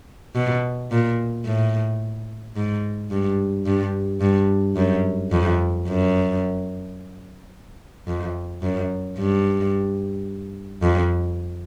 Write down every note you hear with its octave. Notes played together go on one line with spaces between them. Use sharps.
B2
A#2
A2
G#2
G2
G2
G2
F#2
F2
F#2
F2
F#2
G2
F2